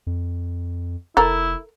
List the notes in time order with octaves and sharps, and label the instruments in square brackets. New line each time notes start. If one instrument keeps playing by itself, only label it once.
[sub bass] F2
[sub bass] F1 [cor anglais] E4 [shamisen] A4 A#4